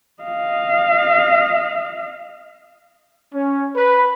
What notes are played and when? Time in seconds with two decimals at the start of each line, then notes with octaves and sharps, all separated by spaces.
0.22 D#5 F5
3.34 C#4
3.76 B4